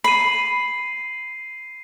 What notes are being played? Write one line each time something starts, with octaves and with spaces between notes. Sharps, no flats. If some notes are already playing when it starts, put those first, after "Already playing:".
B5 C7 D#7